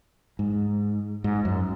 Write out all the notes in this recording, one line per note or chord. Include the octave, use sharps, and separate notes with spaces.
G#2
G#2
F#2